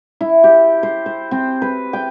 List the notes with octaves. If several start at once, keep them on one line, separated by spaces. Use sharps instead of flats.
E4
G4
C5
C5
C4
B4
G5